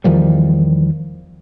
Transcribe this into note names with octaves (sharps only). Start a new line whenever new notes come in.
E2 D#3 F3 G3